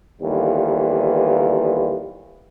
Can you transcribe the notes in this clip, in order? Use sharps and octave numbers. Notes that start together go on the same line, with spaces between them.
D#2 D3 E3 G3 B3 F4